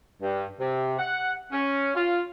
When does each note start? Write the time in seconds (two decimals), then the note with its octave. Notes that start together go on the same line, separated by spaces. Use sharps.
0.22 G2
0.60 C3
0.99 F#5
1.52 C#4
1.94 F4